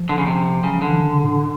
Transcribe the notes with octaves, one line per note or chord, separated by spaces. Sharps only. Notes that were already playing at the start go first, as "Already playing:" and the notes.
Already playing: F3
D3
C#3
C3
C#3 F#3
F3
D3
E3
D#3
C#3
A2